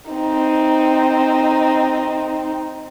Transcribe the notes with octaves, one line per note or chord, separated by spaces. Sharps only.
C4 D#4